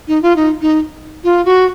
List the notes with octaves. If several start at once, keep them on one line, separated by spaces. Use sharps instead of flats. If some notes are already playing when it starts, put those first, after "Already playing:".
D#4
F4
D#4
D#4
F4
F#4